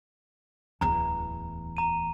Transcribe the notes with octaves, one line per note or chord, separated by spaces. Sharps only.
D1 E2 A#5
A#5 D#7